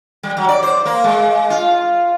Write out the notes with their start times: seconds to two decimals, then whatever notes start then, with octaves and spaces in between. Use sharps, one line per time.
0.23 G3
0.37 F#3
0.49 D5
0.63 C5
0.85 A#3
1.04 G#3
1.50 F4